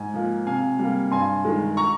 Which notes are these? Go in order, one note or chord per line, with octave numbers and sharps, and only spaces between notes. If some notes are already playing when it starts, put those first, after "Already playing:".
Already playing: G#2 G#5
F3 A#3
C3 F5 G#5
G3 A#3
G2 G#5 C6
D#3 G#3
A#5 C#6